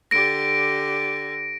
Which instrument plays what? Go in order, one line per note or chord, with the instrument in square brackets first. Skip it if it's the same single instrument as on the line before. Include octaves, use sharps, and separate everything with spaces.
[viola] D3 G4 [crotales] A#6 D7